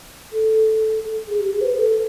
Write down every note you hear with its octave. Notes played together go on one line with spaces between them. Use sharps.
A4
G#4
G4
G#4
C5
B4
A4